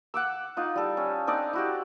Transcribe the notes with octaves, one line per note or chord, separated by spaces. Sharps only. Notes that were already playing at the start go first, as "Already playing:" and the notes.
F#5 D6 E6
D#4 F4
G3 A4
C#4
C4 D4 D#4 D5
E4 F#4 G4